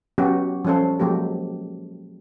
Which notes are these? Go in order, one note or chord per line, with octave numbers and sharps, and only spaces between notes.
F#3 B3 C#4 F#4 G4
F3 G3 C#4 A4 C5
F3 F#3 G#3 A#3 G4